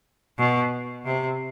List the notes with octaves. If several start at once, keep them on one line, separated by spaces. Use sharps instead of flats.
B2
C3